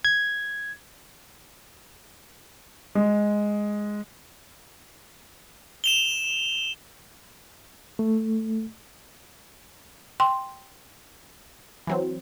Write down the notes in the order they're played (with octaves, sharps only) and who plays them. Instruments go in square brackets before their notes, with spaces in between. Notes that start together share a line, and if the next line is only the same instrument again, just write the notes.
[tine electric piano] G#6
[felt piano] G#3
[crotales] E7 F7 G7
[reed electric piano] A3
[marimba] G5 [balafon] C6
[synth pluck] E3 F#3 C4